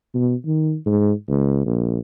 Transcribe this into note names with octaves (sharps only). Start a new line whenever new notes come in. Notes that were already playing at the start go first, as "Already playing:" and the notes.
B2
D#3
G#2
C#2
A#1